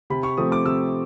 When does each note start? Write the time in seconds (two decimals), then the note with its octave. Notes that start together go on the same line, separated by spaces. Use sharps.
0.10 C3 B5
0.23 C#6
0.37 F3 A3 C4 D#6
0.52 D6
0.66 C3 E6